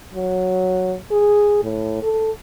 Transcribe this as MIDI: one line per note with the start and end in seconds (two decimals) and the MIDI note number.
0.14 0.95 54
1.11 1.62 68
1.63 1.98 45
2.02 2.31 69